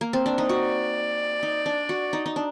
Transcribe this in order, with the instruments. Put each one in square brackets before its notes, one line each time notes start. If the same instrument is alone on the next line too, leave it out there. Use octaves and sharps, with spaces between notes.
[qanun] A#3
C4
D4
D#4
[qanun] F#4 [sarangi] D5
[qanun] D#4
D4
F#4
D#4
D#4
D4